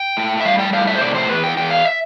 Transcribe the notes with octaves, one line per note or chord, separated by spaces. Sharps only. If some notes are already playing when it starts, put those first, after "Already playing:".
Already playing: G5
A2
E5
G3 F5
G5
A2 F5
E5
C5
C3 D5
C5
E2 B4
G5
E2 G5
F5
E5